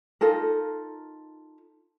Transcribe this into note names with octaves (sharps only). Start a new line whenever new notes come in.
D#4 F4 A4 A#4